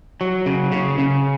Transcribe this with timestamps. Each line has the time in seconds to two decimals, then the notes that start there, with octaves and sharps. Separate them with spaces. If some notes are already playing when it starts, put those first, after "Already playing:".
0.21 F#3
0.46 C#3
0.72 C#3
0.98 C#3